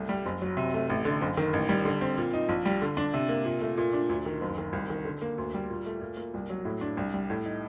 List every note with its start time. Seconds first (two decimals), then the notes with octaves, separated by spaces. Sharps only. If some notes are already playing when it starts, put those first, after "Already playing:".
Already playing: C2 A3
0.09 G3
0.26 F#1
0.42 F#3
0.57 C3
0.74 A3
0.90 A1
1.05 D3
1.21 F#1
1.37 D#3
1.53 A1
1.69 G3
1.85 D3
2.01 C4
2.18 A#2
2.34 D#4
2.49 A#1
2.65 G3
2.82 D3
2.97 D4
3.14 C3
3.29 A#3
3.45 A#2
3.61 A3
3.77 A#2
3.93 D4
4.09 D2
4.26 D#3
4.41 F#1
4.58 D#3
4.73 C2
4.90 D#3
5.05 D3
5.22 A#3
5.38 D2
5.54 G3
5.70 A#2
5.86 A3
6.01 A#2
6.17 A#3
6.34 C2
6.50 F#3
6.65 A2
6.81 D4
6.97 C2
7.14 G3
7.30 A2
7.45 D#4